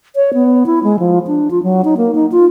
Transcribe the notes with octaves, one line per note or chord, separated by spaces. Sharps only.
C#5
B3
E4
G#3
F3
D4
F4
F#3
D#4
A#3
D#4
F4